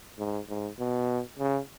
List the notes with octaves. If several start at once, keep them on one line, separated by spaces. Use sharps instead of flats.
G#2
G#2
B2
C#3